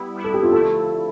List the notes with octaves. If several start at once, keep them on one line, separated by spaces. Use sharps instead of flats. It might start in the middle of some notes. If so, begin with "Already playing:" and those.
Already playing: G3 B3 E4
G3 B3 E4
A4
G4
F4
D3 F3 A3 E4 A4